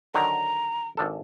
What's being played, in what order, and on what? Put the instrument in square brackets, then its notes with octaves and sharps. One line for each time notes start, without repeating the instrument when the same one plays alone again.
[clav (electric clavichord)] D3 D#3 F#3 [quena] A#5
[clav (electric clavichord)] G#1 D4 A4